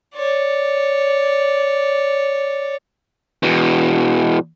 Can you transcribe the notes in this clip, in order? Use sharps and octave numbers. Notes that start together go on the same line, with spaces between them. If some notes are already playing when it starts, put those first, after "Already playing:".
C#5 D5
E2 B2